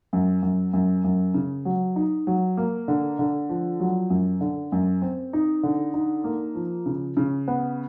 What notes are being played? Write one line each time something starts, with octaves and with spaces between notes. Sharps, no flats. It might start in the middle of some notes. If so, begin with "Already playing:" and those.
F#2
F#2
F#2
F#2
C#3
F#3
D#4
F#3
A#3
D3
D3
F3
F#3
F#2
D3
F#2
C4
D#4
D3
D#4
A#3
F3
C#3
C#3
B3